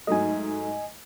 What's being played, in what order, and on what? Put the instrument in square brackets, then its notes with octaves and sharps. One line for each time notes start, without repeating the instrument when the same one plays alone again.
[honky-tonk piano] G#2 F#3 A3 [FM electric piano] D#5 G#5